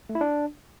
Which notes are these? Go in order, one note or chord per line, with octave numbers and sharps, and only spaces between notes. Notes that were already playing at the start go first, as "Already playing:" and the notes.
A3
E4
D4